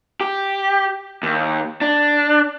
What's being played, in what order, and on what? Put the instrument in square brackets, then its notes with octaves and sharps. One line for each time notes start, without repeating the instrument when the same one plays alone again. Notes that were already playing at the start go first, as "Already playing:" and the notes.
[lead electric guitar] G4
D#2
D4